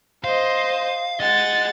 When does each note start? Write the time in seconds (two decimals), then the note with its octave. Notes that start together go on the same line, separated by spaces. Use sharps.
0.24 C5 D#5 F5
1.20 G#4 D#5 F#5 A6